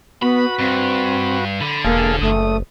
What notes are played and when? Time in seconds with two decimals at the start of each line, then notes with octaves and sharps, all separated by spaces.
0.22 B3 F#4 B4 B5
0.59 G2 C4
1.61 D3 B5
1.85 E1 A#3 G#4 A4 F5
2.22 F#1 A3 D#6